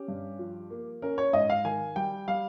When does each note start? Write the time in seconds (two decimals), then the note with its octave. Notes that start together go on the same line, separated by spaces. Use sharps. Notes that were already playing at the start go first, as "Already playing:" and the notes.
Already playing: C#4 G4
0.08 G2
0.39 F3
0.70 A#3
1.02 C#4 A#4
1.18 C#5
1.33 G#2 D#5
1.50 F5
1.64 D#3 G#5
1.96 G3 G5
2.27 G3 F5